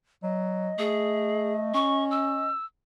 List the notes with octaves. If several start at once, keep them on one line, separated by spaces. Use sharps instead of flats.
F#3 D#5
A3 G#4
C#4 C#6
E6